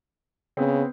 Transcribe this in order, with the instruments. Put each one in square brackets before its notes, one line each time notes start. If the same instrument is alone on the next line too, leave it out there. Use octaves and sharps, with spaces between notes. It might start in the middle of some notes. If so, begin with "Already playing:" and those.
[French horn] C#3 [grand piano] B3 C4